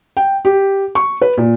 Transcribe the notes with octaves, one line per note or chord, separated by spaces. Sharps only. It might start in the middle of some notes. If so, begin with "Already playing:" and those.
G5
G4
C#6
B4
A#2